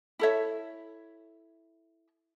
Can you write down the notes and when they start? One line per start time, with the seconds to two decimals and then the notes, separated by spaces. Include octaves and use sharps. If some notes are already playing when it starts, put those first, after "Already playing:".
0.19 E4 A4 C#5 E5